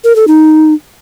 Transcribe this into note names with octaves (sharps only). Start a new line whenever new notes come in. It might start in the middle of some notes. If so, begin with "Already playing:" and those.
A#4
A4
D#4